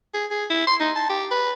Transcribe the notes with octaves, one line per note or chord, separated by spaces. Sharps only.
G#4
G#4
E4
C6
D#4
A5
G4
B4